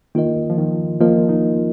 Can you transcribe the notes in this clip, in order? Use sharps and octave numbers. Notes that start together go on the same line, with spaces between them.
D#3 A#3 F4 A#4 D#5
F3
D#3
F3 A#3 F4 A#4 D#5
D#4